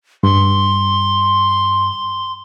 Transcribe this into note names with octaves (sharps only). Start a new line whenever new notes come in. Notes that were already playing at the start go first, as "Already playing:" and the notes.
G2 C6